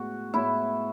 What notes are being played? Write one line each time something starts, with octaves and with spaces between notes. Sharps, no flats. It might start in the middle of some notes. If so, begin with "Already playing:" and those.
Already playing: A2 G#3 B3 F#4
A2 G#3 B3 E4